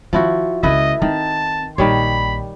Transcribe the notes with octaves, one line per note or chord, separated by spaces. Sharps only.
D#3 F3 E4 F#4
C#2 C#3 E4 A4 B4 D#5
D#3 C4 A5
A#1 D#3 G3 C#5 B5